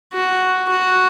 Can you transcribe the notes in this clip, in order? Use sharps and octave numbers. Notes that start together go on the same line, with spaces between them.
F#4
F#4